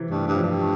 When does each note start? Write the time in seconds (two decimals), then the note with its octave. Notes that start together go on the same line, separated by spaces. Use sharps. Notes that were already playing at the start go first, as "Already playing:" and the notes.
Already playing: C3 E3
0.11 G2 A3
0.28 G2
0.35 F2
0.43 G2
0.61 A3